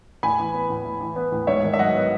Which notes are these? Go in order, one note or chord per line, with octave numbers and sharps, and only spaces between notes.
A2 G#5 B5
E3
B3
A2
A2
E3
B3
A2
G#2 C#5 E5
D#3
E5
F#3 D#5 F#5
B3